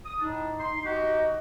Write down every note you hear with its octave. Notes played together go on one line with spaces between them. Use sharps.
D#6
A2 D4 D#4
C6
D#4 F#4 G4 D#5